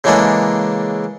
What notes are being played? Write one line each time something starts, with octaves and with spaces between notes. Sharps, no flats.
C#3 E3 G#3 A#3 D4 A4